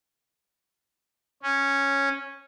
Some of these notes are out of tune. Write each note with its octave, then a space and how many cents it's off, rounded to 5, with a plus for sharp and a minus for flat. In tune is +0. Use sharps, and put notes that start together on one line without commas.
C#4 -5